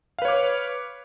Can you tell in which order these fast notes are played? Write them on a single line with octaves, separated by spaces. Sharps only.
F5 B4 C#5 D6